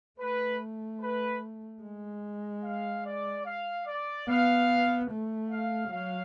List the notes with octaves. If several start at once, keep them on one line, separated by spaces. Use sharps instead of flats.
A3 B4
B4
G#3
F5
D5
F5
D5
B3 F5
A3
F5
F#3 F5